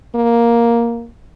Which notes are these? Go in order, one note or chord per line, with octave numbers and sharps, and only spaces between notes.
A#3